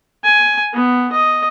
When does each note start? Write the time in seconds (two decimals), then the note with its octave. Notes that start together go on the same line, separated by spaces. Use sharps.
0.24 G#5
0.73 B3
1.12 D#5